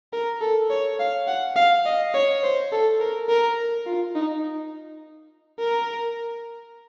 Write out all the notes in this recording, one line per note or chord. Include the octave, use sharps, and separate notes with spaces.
A#4
A4
C#5
F5
F#5
F5
D#5
C#5
C5
A4
A#4
A#4
F4
D#4
A#4